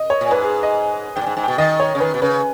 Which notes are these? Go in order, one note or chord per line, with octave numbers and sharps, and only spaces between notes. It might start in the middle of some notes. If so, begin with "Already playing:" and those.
Already playing: D#5
C#5
A#2
G#2 B4
G#4
D#5
G#2 G5
A#2
G#2
G#2
B2 G5
D#3 D#5
C#5
C#3
D#3 B4
B2
C#3 B4